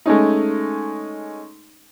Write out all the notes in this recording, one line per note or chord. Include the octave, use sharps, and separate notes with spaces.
G#3 A3 C#4 D#4